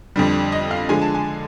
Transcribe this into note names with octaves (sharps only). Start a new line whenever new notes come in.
F2 D3 G3
D#5
F5
D3 F3 G#3 G#5
A5
G#5